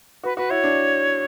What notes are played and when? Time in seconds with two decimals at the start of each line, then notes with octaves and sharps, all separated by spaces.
0.23 F#4 B4
0.37 F#4 B4
0.50 E4 C#5
0.64 D4